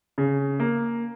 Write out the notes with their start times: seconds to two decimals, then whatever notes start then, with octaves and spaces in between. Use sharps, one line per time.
0.18 C#3
0.60 A#3